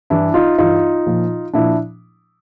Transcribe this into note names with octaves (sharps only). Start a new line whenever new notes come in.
G2 E3 D4 E4
D#4 F4
G2 E3 D#4 F4
A#2 F3
A#2 F3 D4 E4